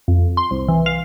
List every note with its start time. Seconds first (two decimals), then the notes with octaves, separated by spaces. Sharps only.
0.08 F2
0.37 C6
0.51 C2
0.68 E3
0.86 F5